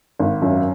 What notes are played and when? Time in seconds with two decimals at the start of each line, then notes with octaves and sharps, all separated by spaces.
0.19 G#1
0.42 F#2